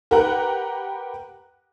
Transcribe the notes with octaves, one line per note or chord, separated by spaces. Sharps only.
G4 A#4 B4 F#5 A#5 F#6